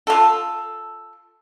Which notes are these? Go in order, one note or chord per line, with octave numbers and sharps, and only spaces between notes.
F4 A4